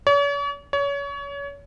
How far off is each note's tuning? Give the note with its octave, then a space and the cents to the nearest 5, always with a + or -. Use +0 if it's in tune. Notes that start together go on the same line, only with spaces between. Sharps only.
C#5 +45
C#5 +30